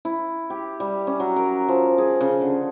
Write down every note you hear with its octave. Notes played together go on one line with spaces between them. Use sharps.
E4
G4
G3
C#4
F#3
A#4
F3
G#4
C#3
D3